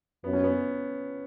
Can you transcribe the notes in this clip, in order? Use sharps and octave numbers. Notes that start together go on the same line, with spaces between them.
F#2 B3
C#4
B3